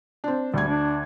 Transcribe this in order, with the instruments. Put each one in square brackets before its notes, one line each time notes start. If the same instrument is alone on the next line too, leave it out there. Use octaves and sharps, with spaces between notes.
[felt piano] C4 D4
[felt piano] D2 G#6 [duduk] G3
[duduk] D4